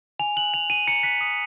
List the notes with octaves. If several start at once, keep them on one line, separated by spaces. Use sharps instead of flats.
G#5 F7
F#6 F#7
G#5 F7
G#5 D#7
A#5 C#7
F#6 B6
D#6